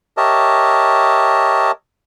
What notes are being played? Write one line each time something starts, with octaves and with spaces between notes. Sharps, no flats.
G4 A#4 C#5 D#5 E5 A5